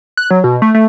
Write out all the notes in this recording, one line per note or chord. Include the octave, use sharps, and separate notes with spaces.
F#6
F#3
B2
A3
A3